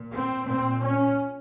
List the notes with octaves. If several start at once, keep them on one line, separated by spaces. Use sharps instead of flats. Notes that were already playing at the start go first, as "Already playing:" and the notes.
Already playing: A#2
C4
A#2 C4
C#4